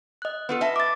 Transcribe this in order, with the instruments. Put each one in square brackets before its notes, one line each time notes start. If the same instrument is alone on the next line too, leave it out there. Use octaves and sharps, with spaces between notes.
[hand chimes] D#5 F#6
[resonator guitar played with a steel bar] B3 F4 A4 [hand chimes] B4
[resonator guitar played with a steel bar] D#5 E5 A5
[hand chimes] D6 A6